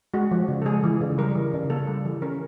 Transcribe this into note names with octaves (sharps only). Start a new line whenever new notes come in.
G#3 F#4
F3
C#3
A4
G#3 G#4
E3
C#3
G3 A#4
E3
C#3
A#3 A4
G3
E3
C#4 A#4